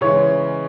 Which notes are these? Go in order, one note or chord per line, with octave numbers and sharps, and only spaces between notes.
C#3 E3 G#3 C#5